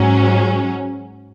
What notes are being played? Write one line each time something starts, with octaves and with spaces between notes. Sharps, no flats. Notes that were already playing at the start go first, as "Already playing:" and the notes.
Already playing: G#2 F#3 C#4